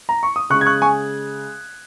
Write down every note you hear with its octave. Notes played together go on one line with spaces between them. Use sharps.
A#5
C#6
D#6
C#3 G#3 C#6 F#6
G#6
C#6 F#6
G#5 C#6